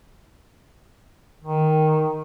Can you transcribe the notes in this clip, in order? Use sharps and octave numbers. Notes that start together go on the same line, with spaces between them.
D#3